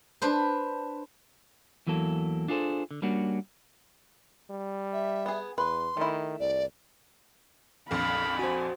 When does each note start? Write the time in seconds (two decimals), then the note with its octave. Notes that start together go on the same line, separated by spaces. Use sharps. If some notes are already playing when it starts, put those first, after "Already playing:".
0.22 D4 B4 C5
1.87 E2 E3 F#3 A#3 A4
2.48 D4 F4 G#4 A4 C5
2.91 D3
3.02 G3 A#3 C#4 D4 F#4
4.50 G3
4.93 E5
5.26 B3 G#4
5.58 E2 B4 C6
5.97 D#3 A3 E4
6.40 C2 D5
7.91 A#1 F2 F5 B5
8.39 F#4 C5 G#5